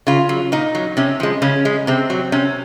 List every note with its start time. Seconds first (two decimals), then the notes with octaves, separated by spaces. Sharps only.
0.07 C#3 F4
0.29 F#3
0.52 A#2 D#4
0.75 F#3
0.97 C3 C#4
1.20 F3 G#3
1.42 C#3 C#4
1.65 G#3
1.87 C3 C4
2.10 F#3
2.32 C3 C#4